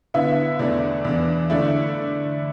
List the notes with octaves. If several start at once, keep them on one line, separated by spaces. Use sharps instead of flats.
D3 B3 E4 E5
E2 E3 A3 D4 D5
E2 E3 D4
D3 A3 E4 D5